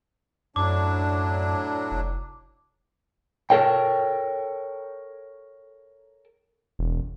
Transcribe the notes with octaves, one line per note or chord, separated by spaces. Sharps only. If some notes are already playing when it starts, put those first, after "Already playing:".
F#2 A2 F#3 D4 D6
F1
A4 A#4 C#5 G5
E1